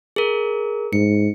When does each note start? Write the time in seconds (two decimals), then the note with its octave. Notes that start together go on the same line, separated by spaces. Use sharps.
0.16 G#4 A#4
0.93 G#2 C#7